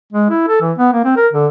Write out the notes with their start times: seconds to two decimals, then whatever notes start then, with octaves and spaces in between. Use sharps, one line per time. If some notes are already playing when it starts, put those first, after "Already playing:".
0.13 G#3
0.30 E4
0.48 A4
0.62 E3
0.78 B3
0.93 A#3
1.05 C4
1.17 A#4
1.33 D3